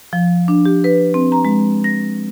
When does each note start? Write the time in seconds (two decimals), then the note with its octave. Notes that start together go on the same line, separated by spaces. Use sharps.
0.13 F3
0.48 D4
0.65 G4
0.84 B4
1.14 C4
1.32 A#5
1.45 G#3
1.84 A#6